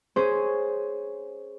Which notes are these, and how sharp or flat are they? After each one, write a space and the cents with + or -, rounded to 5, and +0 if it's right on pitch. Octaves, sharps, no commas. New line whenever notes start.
C#4 +0 G#4 +0 C5 -5